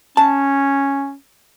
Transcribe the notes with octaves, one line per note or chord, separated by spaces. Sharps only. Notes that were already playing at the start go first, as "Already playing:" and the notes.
C#4 A5